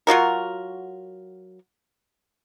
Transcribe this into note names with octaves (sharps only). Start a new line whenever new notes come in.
F#3 F4 F#4 A#4